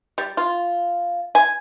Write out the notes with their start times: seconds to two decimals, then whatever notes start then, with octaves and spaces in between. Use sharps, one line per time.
0.18 G3
0.37 F4
1.35 G#5